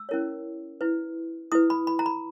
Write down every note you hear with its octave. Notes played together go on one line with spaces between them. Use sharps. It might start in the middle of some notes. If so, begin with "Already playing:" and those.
Already playing: E6
C#4 E4 A#4 C#5
E4 B4
E4 B4 D#6
B5
B5
A#5
B5